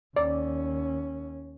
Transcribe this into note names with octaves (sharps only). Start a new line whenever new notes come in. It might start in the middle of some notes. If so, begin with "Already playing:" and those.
D#2 C#4 D5